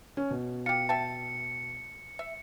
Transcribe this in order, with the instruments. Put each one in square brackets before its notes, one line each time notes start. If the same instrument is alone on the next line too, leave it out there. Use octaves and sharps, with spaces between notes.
[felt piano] C#4
B2
[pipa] F4 G4 [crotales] C#7
[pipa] E5 G5 A5
E5